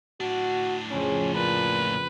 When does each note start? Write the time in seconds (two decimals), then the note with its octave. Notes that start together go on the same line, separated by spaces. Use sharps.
0.21 A2 D4 F#4
0.91 F2 C#3 C#4
1.35 A#2 B4